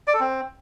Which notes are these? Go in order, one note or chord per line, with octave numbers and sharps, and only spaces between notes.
D5
A4
C4